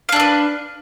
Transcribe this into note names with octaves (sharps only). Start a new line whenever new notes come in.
D4 A4 B4 F5